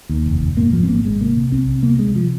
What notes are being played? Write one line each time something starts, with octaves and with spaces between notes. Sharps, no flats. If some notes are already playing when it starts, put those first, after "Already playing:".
D#2
F1
F1
G#2 A#3
G#2 F3
C4
G#1 A#3
G#1 G#3
C3 A#3
C3
C2 C4
C2
C3 A#3
C3 G#3
F3